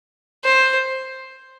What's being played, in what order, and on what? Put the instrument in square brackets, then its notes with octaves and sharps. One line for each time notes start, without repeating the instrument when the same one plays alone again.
[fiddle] C5